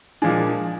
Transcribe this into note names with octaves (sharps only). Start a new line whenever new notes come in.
A#2 F3 G#3 D4 G#4